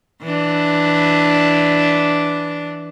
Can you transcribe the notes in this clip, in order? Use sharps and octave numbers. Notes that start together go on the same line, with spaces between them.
E3 D4